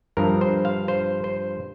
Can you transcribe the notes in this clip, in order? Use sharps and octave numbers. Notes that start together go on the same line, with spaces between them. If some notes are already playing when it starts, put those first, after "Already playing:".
G2 F3 A#4
C5
F5
C5
C5